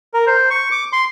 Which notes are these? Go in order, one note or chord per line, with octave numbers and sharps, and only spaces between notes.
A#4
C5
C#6
D6
C6